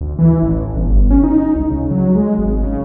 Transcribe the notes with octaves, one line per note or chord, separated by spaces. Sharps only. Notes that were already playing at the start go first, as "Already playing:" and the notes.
D2
E3
A1
G1
C#4
D#4
C#2
C#3
F#3
G#3
G#1
C#3